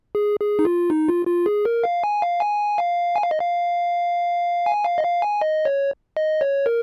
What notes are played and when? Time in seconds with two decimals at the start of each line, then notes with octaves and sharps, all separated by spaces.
0.15 G#4
0.40 G#4
0.59 D#4
0.65 F4
0.90 D#4
1.08 F4
1.27 F4
1.46 G#4
1.65 A#4
1.84 F5
2.04 G#5
2.22 F5
2.40 G#5
2.78 F5
3.16 G#5
3.23 F5
3.31 D#5
3.40 F5
4.66 G#5
4.85 F5
4.98 D#5
5.03 F5
5.22 G#5
5.42 D#5
5.65 C#5
6.17 D#5
6.41 C#5
6.66 A#4